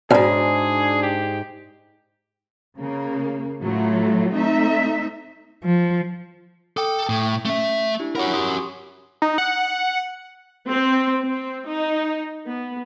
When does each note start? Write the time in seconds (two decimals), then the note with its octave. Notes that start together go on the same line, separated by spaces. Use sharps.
0.11 F2 G#2 D4 F#4 G#4 D5
1.02 G4
2.78 C#3 A#3
3.60 A2 F#3 A3 F4
4.33 A3 C4 D#4 E5
5.63 F3
6.77 A4 G5 D6 D#6
7.09 A2
7.45 A3 C#4 E5
8.00 D4 E4 G4
8.15 F#4 A#4 C#5 F#5 B5
8.33 G4 C6 D#6
9.22 D#4
9.38 F#5
10.68 C4
11.23 C4
11.66 D#4
12.47 B3